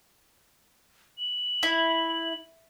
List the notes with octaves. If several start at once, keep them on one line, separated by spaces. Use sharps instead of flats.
F#7
E4